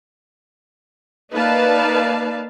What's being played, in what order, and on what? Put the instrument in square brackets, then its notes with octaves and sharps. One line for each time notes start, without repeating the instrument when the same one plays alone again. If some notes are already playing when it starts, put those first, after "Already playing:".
[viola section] A#3 D#4 B4 D5 F5 A5